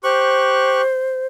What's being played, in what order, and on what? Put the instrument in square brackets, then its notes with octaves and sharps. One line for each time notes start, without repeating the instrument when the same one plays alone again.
[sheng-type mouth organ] G4 C#6 F#6 [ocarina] C5